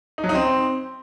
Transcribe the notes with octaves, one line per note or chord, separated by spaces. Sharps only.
D#4
F#3
D#4
C4